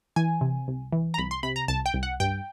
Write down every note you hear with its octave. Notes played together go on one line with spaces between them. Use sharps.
E3 G#5
C3
C2
E3
A#5
C2 B5
C6
C3 B5
A#5
C2 A5
G5
C2
F#5
G2 G5